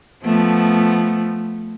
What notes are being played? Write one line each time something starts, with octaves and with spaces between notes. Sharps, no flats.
F3 A3 B3